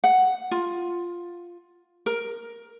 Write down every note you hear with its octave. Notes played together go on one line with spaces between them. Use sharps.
F#5
F4
A#4